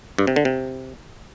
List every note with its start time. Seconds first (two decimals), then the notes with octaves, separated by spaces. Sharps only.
0.18 G2
0.27 C3
0.36 D3
0.45 C3